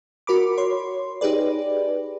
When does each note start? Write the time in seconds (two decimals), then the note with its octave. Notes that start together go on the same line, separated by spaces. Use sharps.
0.27 F#4 A#4 B5 D6
0.58 C#5 C6
1.21 D#4 G4 G#4 B4 D5